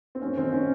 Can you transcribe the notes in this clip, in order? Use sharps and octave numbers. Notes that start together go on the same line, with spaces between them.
C4
F#2 C#4
D#3 C4
C#4